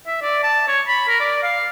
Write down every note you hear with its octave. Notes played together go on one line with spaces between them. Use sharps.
E5
D5
A5
C#5
B5
A#4
D5
F5